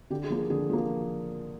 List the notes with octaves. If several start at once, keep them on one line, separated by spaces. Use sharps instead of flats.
D3 G4
G#4
F3 A#3
G#4
D3 G#4
F3 A#3